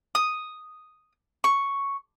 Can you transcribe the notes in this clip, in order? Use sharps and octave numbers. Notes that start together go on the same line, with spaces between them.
D#6
C#6